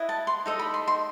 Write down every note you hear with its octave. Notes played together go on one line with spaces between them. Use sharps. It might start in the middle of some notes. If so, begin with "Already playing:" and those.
Already playing: E4 B4 D#5
A5
C6
D#4 A4 D#5
B5
C6
C6